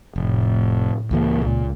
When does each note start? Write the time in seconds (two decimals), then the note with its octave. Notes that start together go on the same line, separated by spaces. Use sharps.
0.16 F1 A2
1.11 C#2 E3 A#3
1.42 C#2 A#2